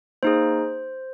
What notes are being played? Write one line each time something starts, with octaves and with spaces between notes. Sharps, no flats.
A#3 D#4 G#4 C5